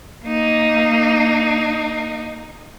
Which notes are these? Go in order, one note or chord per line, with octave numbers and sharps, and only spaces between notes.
A#3 D#4